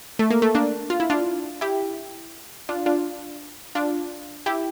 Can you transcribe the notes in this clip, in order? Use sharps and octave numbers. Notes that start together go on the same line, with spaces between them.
A3
A#3
A3
A#3 D4
F4
E4
D4 F4
E4 G4
D4 F4
D4 F4
D4 F4
E4 G4